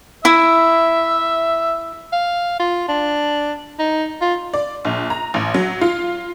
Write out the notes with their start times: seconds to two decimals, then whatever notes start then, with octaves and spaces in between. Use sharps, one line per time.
0.25 E4 E5
2.13 F5
2.60 F4
2.89 D4
3.79 D#4
4.21 F4
4.54 D5
4.85 A#1
5.10 A#5
5.34 A1
5.54 F#3
5.81 F4